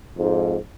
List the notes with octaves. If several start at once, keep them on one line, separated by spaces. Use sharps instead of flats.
F2 G#2